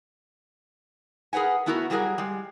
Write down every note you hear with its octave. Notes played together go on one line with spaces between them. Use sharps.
G#4 A#4 B4 F#5 G#5
A3 B3 E4 F#4 A4 A#4
F#3 G3 E4 G#4 A#4 F#5
G3 G#3